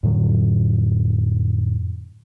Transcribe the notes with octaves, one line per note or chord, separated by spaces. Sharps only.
F2 A2 D3 F#3